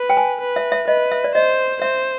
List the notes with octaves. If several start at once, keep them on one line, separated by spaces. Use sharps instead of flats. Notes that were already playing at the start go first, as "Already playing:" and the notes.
Already playing: B4
G5
G#5
B4
E5
E5
B4 D#5
E5
D5
C5 D#5
C5 E5